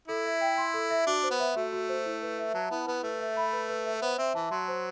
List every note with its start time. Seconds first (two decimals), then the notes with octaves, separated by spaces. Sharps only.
0.08 E4 A4
0.25 E5
0.41 G5
0.58 C6
0.74 A4
0.90 E5
1.07 D4 F#4
1.23 C5
1.31 B3
1.40 E5
1.56 A3 F#4
1.72 F#4
1.89 C5
2.06 E4
2.22 B4
2.38 E5
2.54 F#3 A5
2.71 B3 E4
2.87 B3 B4
3.03 A3 B4
3.20 E5
3.37 B5
3.53 B4
3.69 B4
3.86 E5
4.02 B3 C5
4.18 C4 E5
4.35 E3 A5
4.51 F#3 C6
4.68 C5